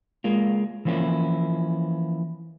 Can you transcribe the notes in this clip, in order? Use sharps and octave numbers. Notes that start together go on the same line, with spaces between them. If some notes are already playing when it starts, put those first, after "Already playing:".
G#3 A#3 F4
E3 F3 A#3 C#4 E4